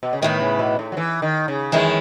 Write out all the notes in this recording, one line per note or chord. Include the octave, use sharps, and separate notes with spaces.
B2
C#3
A2 D#3 E3 B3
C#3
B2
A2
F#3
E3
D#3
C#3
F#2 D#3 E3 G#3 C#4 E4